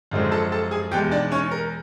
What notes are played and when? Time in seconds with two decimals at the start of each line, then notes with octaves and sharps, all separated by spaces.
0.11 F#2 D3 F3 G#3 C4
0.32 A4 A5
0.52 A4 A5
0.71 G#4 G#5
0.91 E2 B2 G#3 G4 G5
1.11 D4 D5
1.31 C#4 C#5
1.51 A#4